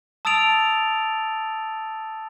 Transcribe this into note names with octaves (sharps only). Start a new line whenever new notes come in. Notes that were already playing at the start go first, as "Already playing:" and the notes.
A5 D#6 E6 A6 D7 F7